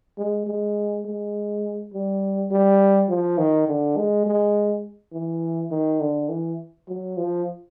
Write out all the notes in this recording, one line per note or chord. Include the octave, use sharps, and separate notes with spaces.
G#3
G#3
G#3
G3
G3
F3
D#3
D3
G#3
G#3
E3
D#3
D3
E3
F#3
F3